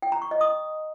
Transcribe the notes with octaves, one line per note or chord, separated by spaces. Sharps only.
G5
A#5
C#6
D#5
D#6